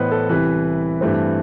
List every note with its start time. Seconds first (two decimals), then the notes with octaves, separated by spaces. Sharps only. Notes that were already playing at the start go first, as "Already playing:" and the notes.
Already playing: A2 E3 B3 B4 C5 D#5
0.11 A4
0.29 C2 C3 E3 B4
1.01 G2 E3 A3 C4